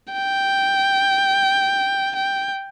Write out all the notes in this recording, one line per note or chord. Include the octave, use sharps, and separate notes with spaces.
G5
G5